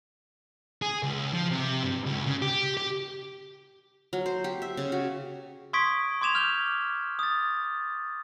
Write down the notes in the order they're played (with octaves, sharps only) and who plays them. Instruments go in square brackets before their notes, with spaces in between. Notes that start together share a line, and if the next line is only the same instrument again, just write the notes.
[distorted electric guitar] G#4
C#2
F3
C3
G2
C#2
C#3
G4
G4
[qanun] F#3
C5
G4
E5
C#3
F#4
[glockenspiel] C6 C#6 D#6 G#6 B6 D7
C6 D6 G#6 E7 F7
F6 G6 F7 G7
D#6 A6